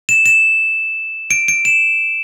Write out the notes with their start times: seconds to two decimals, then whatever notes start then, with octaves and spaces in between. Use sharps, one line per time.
0.09 E7
0.26 E7
1.31 D7
1.48 D7
1.65 E7